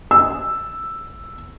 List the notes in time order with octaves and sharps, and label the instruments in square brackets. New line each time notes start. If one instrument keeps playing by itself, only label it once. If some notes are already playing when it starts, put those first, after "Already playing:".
[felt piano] E6